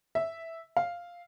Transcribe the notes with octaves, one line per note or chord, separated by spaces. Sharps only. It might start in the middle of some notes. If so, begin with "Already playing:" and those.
E5
F5